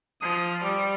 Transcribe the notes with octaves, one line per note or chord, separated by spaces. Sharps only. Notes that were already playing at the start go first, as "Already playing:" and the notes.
F3 D#6
G3 D6